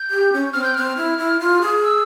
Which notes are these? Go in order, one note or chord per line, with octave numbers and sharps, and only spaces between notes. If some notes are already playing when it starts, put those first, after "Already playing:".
Already playing: G6
G4
C#4
C4 F6
G6
C4 F6
E4
E4
F4
G#4
E6